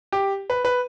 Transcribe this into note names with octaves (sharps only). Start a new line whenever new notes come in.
G4
B4
B4